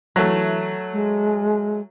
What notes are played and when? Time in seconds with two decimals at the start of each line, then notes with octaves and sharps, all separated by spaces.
0.16 E3 F#3 A3
0.93 G#3